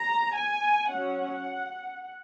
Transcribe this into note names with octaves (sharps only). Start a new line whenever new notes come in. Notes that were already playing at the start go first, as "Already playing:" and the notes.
Already playing: A#5
G#5
F#3 C#4 F#5